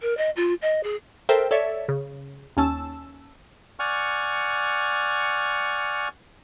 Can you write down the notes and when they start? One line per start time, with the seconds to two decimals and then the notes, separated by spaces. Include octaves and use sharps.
0.01 A#4
0.17 D#5
0.36 F4
0.62 D#5
0.83 G#4
1.29 A4 A#4 C5 E5 G5
1.51 A4 C#5 D5 E5
1.88 C#3
2.57 D#2 C#4 A5 E6
3.79 D5 F#5 G#5 C#6 F6